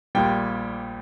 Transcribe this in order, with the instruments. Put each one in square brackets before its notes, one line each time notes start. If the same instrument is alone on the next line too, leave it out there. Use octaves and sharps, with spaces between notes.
[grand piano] A#1 A#2 G3 G5